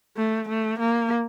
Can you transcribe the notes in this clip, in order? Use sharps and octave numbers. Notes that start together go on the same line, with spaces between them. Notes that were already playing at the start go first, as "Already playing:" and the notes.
A3
A3
A#3